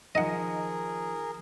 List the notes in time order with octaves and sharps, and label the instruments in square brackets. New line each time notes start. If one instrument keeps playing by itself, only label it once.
[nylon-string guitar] D#3 F3 D#4 [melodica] G#4 A#4 [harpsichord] D#5 F#5